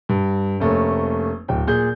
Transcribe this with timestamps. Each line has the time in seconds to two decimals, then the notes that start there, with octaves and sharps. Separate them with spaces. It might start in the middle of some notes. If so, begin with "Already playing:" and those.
0.09 G2
0.60 F1 A3 A#3 C#4
1.48 D1 G5
1.67 A#2 G#4 G6